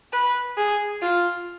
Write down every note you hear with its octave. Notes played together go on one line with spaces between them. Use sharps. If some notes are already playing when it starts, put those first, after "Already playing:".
B4
G#4
F4